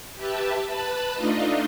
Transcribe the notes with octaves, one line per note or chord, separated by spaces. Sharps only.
G4 B4 E5 A5
B4 A5 B5 F#6
A3 D4 D#4 F4 D#5